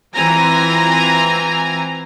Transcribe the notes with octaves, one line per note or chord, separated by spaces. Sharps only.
E3 C4 F4 G#5 A#5